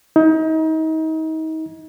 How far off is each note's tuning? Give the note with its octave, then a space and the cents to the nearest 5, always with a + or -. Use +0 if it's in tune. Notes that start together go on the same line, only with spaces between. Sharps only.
D#4 +35